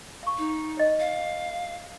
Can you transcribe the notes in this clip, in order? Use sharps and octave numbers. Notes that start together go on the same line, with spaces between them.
F5 C#6
D#4
C#5 D#5
F5